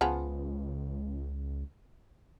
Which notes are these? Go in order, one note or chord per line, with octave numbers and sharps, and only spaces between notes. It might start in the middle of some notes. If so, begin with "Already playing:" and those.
C#2 F3 B3 G#4